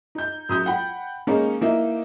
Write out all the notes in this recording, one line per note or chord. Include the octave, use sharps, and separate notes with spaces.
D#4 G6
F#2 D#6 G6
F#5 G5 B5
G#3 A#3 C#4 D#4
E3 A#3 D#4 E5